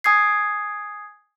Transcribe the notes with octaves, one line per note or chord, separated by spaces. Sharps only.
G#5 D#6 G#6 C7